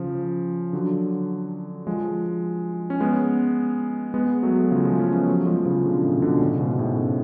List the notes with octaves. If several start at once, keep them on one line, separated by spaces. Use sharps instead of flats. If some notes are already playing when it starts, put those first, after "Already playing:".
Already playing: C#3 F3
D3 F#3
F3 G#3
C#4
G#3 B3
G#3 B3
F#3 A3
C#3 F3
F3 G#3
A3 C#4
G#3 B3
F#3 A3
F3 G#3
C#3 F3
B2 D3
A2 C#3
B2 D3
A2 C#3
C#3
G#2 B2
A2 C#3